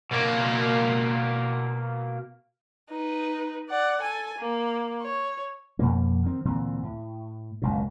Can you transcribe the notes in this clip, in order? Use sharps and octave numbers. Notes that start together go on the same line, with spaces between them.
B2 A#3
D#4 B4
D5 F#5
A4 G#5
A#3
C#5
F2 B2 A#3
D#3 C4
D2 A#2 E3 C4
A2
F#1 C#2 B2